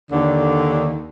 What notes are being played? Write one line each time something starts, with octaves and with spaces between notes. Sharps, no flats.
D#2 D3